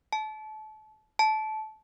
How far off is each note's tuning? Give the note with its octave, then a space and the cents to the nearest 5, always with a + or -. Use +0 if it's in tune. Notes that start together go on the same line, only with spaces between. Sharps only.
A5 -30
A5 -20